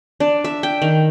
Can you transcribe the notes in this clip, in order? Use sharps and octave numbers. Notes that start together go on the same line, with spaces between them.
D4
E5
G5
D#3